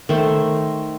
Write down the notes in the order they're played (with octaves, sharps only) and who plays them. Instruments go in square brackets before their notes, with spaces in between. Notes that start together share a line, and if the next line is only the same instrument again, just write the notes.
[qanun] D#3 A3 C5